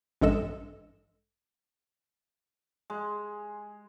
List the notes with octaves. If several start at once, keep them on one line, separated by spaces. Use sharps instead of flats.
A1 G2 G#3 A4 D#5 E7
G#3